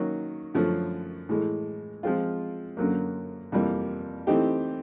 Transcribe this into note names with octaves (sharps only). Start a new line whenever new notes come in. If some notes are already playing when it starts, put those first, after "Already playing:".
Already playing: D#3 F#3 A#3 C#4
F#2 D3 F3 A3 C#4
A2 E3 G#3
F3 G#3 C4 F4
F#2 D3 F#3 A#3
F2 C3 E3 G3 A#3
E3 A3 C4 D#4 G4